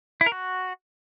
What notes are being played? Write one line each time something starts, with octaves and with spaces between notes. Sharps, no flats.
E4
A#4
F#4